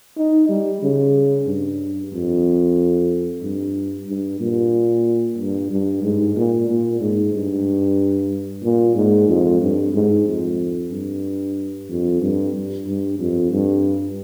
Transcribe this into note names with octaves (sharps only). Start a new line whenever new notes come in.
D#4
G3
C#3
G2
F2
G2
G2
A#2
G2
G2
G#2
A#2
A#2
G#2
G2
A#2
G#2
F2
G2
G#2
F2
G2
F2
G2
G2
F2
G2